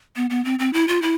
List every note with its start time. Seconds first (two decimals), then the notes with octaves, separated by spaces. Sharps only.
0.16 B3
0.30 B3
0.45 C4
0.59 C4
0.73 E4
0.88 F4
1.02 E4